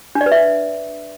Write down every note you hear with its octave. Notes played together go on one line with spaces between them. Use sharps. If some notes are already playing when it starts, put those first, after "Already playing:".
D4
D5
B4
E5